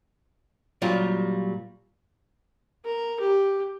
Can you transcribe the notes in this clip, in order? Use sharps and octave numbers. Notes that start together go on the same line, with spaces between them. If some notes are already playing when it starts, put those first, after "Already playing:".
A#2 F#3 G3 F4 G4
A#4
G4